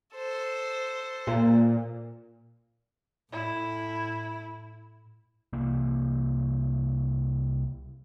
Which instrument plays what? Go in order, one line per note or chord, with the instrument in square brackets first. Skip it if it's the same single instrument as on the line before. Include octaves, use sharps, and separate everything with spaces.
[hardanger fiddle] A4 C5
[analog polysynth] A#2
[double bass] A2 [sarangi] E4
[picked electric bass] C2 C3 A#3